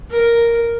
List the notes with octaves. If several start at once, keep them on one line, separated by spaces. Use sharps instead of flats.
A#4